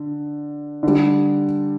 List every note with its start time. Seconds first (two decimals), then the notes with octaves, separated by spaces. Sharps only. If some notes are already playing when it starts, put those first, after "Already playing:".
Already playing: D3
0.83 D3 G3